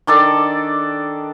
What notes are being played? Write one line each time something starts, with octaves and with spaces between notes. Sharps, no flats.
D#3 D4 A4 D5